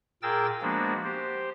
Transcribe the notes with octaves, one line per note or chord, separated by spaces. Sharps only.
A#2 G#4 A#4 G5 E6 A6
F3 G#3 A#3 B3 D4 F#4
G4 C5